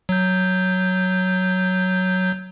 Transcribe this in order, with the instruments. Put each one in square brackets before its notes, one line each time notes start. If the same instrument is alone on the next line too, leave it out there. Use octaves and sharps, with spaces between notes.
[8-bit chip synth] F#3 G6